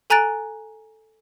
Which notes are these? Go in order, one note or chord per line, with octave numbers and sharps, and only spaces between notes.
A4 G#5 A#5 F#6 A6 D7